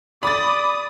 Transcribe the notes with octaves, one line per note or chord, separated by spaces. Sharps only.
D5 B5 D6 D#6 A6